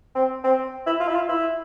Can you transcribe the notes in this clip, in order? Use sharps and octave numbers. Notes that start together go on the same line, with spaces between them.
C4
C4
E4
F4
E4
F4
E4